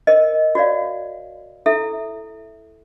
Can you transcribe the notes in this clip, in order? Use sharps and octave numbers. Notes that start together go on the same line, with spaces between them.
A#4 C5 D#5
F#4 C#5 D5 F5
E4 A4 E5